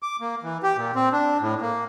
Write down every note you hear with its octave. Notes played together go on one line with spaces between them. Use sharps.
D6
A#3
E3
G4
A#2
C4
D4
A2
A#3